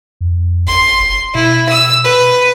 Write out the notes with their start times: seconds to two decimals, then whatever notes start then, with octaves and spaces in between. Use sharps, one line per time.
0.21 F2
0.68 G#1 C6
1.00 F#1
1.35 B2 E4
1.70 E6
2.04 B4